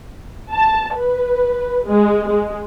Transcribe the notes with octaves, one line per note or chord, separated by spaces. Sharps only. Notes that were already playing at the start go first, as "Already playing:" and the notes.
A5
B4
G#3
G#3